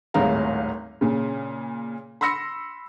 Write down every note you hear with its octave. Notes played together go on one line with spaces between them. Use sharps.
D#1 G#1 A2 G#4 F5 A#5
A#2 C#3
B5 C6 E6 A#6 C#7